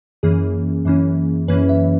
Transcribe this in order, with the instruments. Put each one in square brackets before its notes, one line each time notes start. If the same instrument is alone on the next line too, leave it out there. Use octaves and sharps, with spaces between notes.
[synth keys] F#2 E3 A#3 C#4 G#4
F#2 E3 A#3 C#4
F#2 E3 A#3 C#4 B4
E5